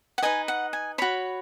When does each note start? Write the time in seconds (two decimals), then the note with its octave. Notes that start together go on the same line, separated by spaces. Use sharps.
0.18 F#5
0.22 D#4 B4 D#5 G#5
0.48 F#5
0.73 G#5
0.98 F#4 C#5 B5